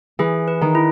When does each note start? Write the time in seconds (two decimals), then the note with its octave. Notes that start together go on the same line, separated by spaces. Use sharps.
0.19 E3 G#4
0.48 B4
0.61 D#3
0.75 E4